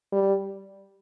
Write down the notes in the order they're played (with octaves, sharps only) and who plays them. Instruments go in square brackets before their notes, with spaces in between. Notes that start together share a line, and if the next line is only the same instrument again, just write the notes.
[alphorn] G3